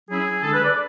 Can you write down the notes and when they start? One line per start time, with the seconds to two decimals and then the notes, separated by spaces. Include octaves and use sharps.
0.08 F#3 C#4 E4 G#4
0.42 D3 G#3 D4 A4
0.53 B4
0.64 D5